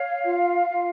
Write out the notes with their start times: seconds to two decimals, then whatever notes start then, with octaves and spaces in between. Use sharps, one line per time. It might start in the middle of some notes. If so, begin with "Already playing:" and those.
Already playing: C#5 F5
0.25 F4
0.70 F4